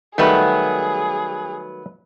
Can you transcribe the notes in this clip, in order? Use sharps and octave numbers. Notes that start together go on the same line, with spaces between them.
D#3 F#3 G3 A3 B3 G#4 B4 G5